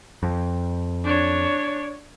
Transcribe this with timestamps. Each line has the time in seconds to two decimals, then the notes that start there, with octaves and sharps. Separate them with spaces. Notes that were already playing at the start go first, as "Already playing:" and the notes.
0.23 F2
1.05 D4 C#5